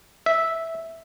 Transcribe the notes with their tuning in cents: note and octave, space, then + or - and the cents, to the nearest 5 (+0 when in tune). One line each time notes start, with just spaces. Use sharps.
E5 -5